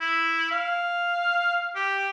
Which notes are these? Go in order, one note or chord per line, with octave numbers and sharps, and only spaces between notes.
E4
F5
G4